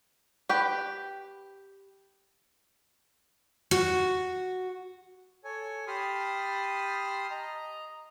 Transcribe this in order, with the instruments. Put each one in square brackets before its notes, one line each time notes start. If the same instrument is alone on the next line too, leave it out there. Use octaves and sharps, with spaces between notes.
[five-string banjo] G4 B4 G5
[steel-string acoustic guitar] F#4
[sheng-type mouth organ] A4 C#5 G#5
G4 A5 B5 C6 D#6 F6
D#5 A#5